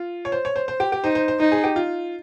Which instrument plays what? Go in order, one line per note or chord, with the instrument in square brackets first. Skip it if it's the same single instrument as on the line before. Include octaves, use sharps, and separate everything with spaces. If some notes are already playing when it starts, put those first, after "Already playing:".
Already playing: [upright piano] F4
C#5
C5
C#5
C5
C5
G4
G4
[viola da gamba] D#4 [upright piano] C5
[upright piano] C5
C5
[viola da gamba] D#4 [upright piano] C5
[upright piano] G#4
G4
F4